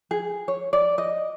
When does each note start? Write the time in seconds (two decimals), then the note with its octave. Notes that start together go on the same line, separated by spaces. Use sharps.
0.11 G#4
0.48 C#5
0.73 D5
0.98 D#5